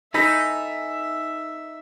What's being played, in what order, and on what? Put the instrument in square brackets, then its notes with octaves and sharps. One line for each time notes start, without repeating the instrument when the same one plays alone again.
[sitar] D#4 [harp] A4 [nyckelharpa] E5 [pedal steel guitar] G#5 A#5 B5